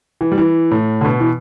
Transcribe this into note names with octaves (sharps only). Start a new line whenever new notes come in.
E3
G3
E3
A2
D3
B2
E3